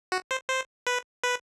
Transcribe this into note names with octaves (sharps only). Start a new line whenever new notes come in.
F#4
C5
C5
B4
B4